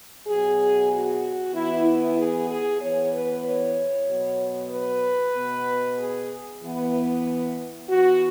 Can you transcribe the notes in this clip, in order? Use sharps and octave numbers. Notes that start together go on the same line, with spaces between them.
B2 F#3 B3 G#4
F#4
E3 B3 E4
E4
G#4
G#4
E3 B3 C#5
B4
C#5
B2 F#3 B3
B4
B2 B3
G#4
E3 B3
E3 B3 F#4